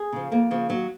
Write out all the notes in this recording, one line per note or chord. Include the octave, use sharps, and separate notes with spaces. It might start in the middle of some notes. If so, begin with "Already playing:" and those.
Already playing: G#4
C#3 F3
F2 A#3
C#3 F3
D#2 F#3